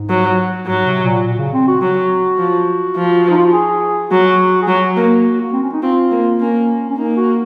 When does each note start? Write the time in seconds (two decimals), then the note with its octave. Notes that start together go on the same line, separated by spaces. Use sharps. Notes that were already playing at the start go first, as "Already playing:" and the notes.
Already playing: G#2
0.10 F#3
0.67 G#2 F#3
0.86 C3
1.05 A#2
1.24 A#2
1.38 C#3
1.53 C4
1.67 F#4
1.81 F#3 F#4
2.38 F3
2.96 F3
3.30 D#4
3.38 F4
3.46 F#4
3.53 G#4
4.11 F#3 F#4
4.62 G#4
4.68 F#3 F#4
4.96 A#3
5.42 A#3
5.52 C4
5.63 C#4
5.73 D#4
5.82 C4 F4
6.11 A#3
6.40 A#3 C#4
6.91 C#4
6.98 A#3 D#4
7.17 F#4